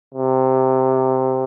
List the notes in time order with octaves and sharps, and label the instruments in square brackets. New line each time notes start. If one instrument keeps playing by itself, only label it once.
[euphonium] C3